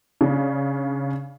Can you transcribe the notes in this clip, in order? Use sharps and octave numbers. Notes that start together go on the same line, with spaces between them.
C#3 D4